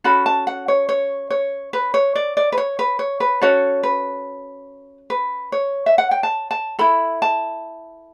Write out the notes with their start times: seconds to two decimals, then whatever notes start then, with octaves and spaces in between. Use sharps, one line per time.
0.04 C#4 F#4 A4 B5
0.26 A5
0.47 F#5
0.68 C#5
0.89 C#5
1.30 C#5
1.73 B4
1.94 C#5
2.15 D5
2.37 D5
2.52 B4
2.58 C#5
2.79 B4
2.99 C#5
3.20 B4
3.42 C#4 F#4 A4 C#5
3.83 B4
5.10 B4
5.52 C#5
5.86 E5
5.98 F#5
6.11 G5
6.23 A5
6.51 A5
6.79 E4 A4 B5
7.22 A5